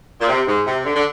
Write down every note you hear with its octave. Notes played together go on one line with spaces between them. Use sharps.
A#2
C3
G#2
C3
D3
D3